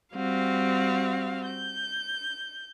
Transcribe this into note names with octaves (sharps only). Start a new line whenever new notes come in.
G3 C4 F#4 F5
G6